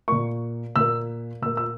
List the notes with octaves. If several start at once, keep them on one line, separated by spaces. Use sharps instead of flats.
A#2 A#3 C#6
A#2 A#3 E6
A#2 A#3 E6
E6